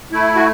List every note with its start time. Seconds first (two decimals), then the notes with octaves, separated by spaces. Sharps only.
0.12 A3 E4
0.36 F#4